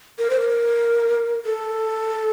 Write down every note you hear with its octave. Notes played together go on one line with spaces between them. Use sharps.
A#4
C5
A#4
A4